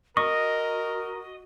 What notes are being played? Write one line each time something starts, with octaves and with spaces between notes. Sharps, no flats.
F#4 A#4 D#5 C#6